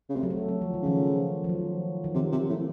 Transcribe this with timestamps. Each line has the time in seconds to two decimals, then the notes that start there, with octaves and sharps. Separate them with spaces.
0.09 C#3
0.15 C3 A3
0.23 F#3
0.30 A3
0.49 F#3
0.62 F3
0.74 D#3
0.82 C#3 F3
1.44 F3
1.49 F#3
2.04 D#3
2.14 C3 F3
2.32 C3
2.49 A2